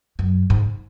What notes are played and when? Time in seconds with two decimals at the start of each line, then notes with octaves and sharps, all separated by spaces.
0.19 F#2
0.50 G#2